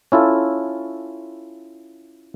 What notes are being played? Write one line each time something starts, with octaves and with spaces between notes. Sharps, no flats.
C#4 E4 F4 A4